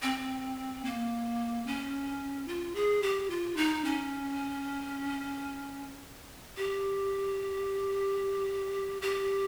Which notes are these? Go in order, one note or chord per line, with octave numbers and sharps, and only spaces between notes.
C4
A#3
C#4
F4
G#4
G4
F4
D#4
C#4
G4
G4